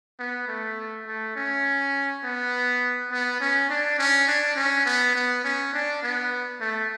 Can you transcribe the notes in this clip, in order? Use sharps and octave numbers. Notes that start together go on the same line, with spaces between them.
B3
A3
A3
C#4
B3
B3
C#4
D4
C#4
D4
C#4
B3
B3
C#4
D4
B3
A3